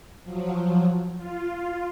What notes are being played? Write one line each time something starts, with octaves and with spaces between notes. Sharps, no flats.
F3 F#3
F4